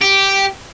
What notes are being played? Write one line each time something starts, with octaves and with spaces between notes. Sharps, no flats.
G4